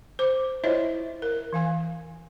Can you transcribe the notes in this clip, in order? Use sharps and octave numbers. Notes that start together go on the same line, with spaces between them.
C5 D6
E4 F4 C5 C#5 D#5 E5
A#4
E3 F5 G#5